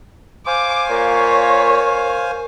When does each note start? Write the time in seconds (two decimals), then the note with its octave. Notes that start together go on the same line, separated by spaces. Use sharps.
0.47 C5 F5 G#5 D6
0.90 A#2 C#5
1.60 A#4